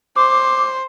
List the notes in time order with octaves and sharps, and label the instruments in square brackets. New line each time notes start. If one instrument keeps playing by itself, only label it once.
[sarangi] C5 [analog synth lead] D6